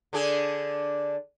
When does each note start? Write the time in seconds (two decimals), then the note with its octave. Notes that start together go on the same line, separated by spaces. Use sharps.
0.13 D3 D4 G#4